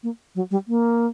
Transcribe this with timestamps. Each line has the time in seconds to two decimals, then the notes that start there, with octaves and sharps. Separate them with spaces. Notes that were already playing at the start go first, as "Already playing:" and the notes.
0.03 A#3
0.35 F#3
0.51 G3
0.68 A#3